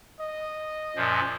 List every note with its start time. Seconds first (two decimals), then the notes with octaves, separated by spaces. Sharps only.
0.20 D#5
0.96 F#2 A#2 F3